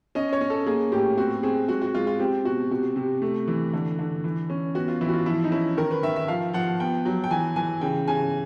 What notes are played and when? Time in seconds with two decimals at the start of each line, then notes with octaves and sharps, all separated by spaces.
0.15 C#4 D#5
0.33 C#5
0.41 C#4
0.50 A4
0.66 A#3 G#4
0.92 A2 G4
1.17 C4 F#4
1.43 C4 G#4
1.69 G#3 F#4
1.82 F#4
1.94 G#3 F4
2.07 F4
2.19 C4 G4
2.45 B2 F#4
2.71 C3 F#4
2.96 C3
3.22 A3
3.47 E3
3.73 D3
3.99 D3
4.24 E3
4.50 C#4
4.75 B3 F#4
4.88 F4
5.01 E3 E4
5.09 F#4
5.13 F4
5.26 F3 E4
5.44 D#4
5.52 C#4 E4
5.77 D#3 A#4
5.91 B4
6.03 D#3 E5
6.16 E5
6.28 F3 F5
6.53 F3 F#5
6.80 B3 G5
7.06 F#3
7.24 G5
7.30 E3 G#5
7.56 E3 G#5
7.81 C#3 G5
8.07 C#3 G#5